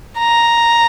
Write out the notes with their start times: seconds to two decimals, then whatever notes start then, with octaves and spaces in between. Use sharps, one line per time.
0.18 A#5